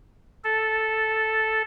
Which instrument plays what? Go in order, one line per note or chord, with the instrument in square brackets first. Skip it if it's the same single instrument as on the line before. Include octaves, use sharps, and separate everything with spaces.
[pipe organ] A4